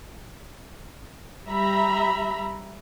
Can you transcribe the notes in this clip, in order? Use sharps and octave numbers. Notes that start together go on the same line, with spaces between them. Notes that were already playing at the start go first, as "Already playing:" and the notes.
G3 E5 A#5 B5